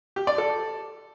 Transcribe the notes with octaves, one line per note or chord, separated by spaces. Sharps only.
G4
D5
A4